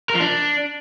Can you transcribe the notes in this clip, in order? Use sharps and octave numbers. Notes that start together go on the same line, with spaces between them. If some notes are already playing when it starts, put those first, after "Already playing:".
A#4
F3
D4